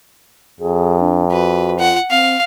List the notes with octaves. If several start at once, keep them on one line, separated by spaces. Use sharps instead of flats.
F2 G#4
D4
F#4 B4
F4 F#5
C4 F5